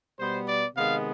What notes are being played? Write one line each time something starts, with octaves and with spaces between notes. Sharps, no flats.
B2 G3 B3 C5
D5
C3 D#3 G#3 B3 F5